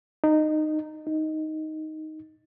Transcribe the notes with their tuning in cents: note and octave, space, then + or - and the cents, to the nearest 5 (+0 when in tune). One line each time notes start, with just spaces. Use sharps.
D#4 -15
D#4 +5